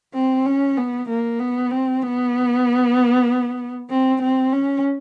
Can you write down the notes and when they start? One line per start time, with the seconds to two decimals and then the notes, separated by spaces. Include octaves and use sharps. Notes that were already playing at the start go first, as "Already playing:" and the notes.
0.14 C4
0.46 C#4
0.77 B3
1.09 A#3
1.39 B3
1.71 C4
2.02 B3
3.90 C4
4.21 C4
4.53 C#4